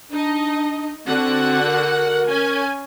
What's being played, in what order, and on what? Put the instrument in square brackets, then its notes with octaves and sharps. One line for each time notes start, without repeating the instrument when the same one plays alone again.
[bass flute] D4 [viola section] D#4 D#5
[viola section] D3 F#4 F#5 [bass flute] C4
[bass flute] A#4
[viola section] C#4 G#5